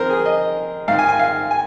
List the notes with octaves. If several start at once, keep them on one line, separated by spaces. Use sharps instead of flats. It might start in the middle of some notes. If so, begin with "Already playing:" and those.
Already playing: F2 D#3 A#4 C5
G#4
D#5
G#2 D#3 F5
G#5
G#5
F5
G#5